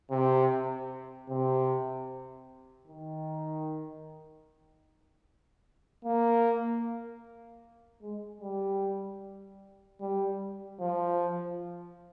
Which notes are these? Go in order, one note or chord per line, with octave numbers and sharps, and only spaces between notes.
C3
C3
D#3
A#3
G#3
G3
G3
F3